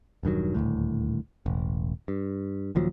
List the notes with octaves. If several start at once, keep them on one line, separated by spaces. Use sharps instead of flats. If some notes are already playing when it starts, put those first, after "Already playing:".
E1 G2 D#3 F#3
D#1 G#1 D2 A2
E1 A1
G2
D#1 D#2 F3 F#3